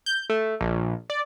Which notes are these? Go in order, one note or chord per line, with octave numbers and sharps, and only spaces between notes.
G6
A3
A#1
D5